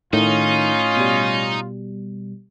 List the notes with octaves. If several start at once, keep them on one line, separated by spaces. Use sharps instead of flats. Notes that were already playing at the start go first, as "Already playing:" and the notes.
A2 D#3 C#4 D#4 F4
B2 G3